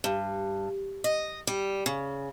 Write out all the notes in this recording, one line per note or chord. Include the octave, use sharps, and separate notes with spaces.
G2
D#5
G3
C#3